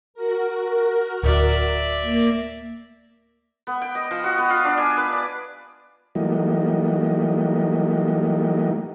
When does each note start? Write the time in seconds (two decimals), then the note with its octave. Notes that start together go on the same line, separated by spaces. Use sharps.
0.14 F#4 A#4
1.23 D1 D5 E5
2.01 A#3 A#4
3.67 B3
3.82 G5
3.95 D#5
4.11 F3
4.24 F#4
4.38 B3
4.50 F4
4.64 D4
4.78 G#5
4.97 B4
5.13 D5
6.15 E3 F#3 G3 A3 A#3 D#4